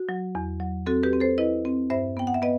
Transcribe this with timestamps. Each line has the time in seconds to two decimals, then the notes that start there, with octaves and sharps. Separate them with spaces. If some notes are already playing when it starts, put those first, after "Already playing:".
Already playing: F#4
0.09 F#3
0.35 E2
0.60 F#3
0.86 C4 F#4 A4
1.03 G4 B4
1.13 C4
1.20 A4 C5
1.38 E4 B4 D#5
1.65 C4
1.90 G2 C5 E5
2.17 B3 G5
2.27 F#5
2.34 E5
2.42 B3 B4 D#5